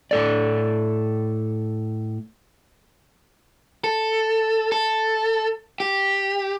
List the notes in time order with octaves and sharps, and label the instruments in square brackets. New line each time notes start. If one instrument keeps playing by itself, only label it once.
[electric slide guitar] A2 A4 D5
[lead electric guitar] A4
A4
G4